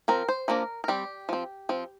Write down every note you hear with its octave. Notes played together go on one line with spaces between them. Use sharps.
F3 C4 A#4
C5
F3 A#3 D4 A#4
A#4
G3 C4 G4
F3 C4
F3 C4